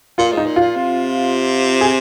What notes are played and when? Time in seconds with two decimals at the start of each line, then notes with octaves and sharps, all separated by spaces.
0.18 A#2 F4
0.32 G#2
0.37 D#4
0.46 A#2
0.56 A#2 F4
0.76 C3
1.81 G#4